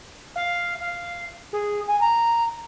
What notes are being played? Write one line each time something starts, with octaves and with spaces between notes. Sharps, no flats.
F5
F5
G#4
G#5
A#5